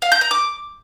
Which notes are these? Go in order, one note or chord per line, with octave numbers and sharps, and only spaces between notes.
F5
G6
A#5
D6